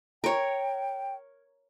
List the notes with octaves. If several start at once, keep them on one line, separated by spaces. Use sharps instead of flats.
A#4 C#5 G5